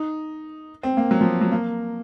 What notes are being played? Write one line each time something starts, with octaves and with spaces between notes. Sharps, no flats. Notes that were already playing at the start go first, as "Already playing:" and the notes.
Already playing: D#4
C4
A#3
F#3
F3
F#3
A#3